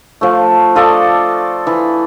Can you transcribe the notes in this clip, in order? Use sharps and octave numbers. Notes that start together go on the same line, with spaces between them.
F3 A3
F4 A4 D5 D#5
E3